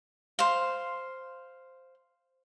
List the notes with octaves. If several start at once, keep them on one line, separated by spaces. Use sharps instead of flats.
C5 F5